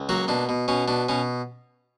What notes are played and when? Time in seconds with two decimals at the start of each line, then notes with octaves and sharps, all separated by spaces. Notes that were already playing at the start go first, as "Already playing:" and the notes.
Already playing: C#2
0.09 F#3 A#3 F#4
0.28 B2 D4
0.49 B2
0.68 B2 C#4
0.88 B2 D4
1.09 B2 C#4